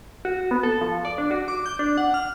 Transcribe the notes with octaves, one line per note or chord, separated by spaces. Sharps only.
F#4
B3
A4
F3
D5
D4
F#4
D6
G6
D4
F#5
F6